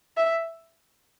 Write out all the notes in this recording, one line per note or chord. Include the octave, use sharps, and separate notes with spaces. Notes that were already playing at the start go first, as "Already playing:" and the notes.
E5